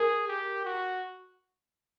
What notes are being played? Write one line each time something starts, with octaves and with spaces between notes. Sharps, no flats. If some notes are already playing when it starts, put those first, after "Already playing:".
Already playing: G#4 A#4
G4
F#4